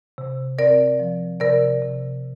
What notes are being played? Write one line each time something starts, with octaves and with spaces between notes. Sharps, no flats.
C3
C4 A#4 D5
F3
C3 A#4 D5
C3